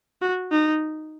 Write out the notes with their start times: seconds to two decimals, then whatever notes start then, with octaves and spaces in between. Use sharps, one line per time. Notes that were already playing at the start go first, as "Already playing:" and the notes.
0.22 F#4
0.51 D#4